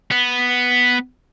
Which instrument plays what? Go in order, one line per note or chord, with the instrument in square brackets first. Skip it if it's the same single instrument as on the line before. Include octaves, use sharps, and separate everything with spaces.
[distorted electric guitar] B3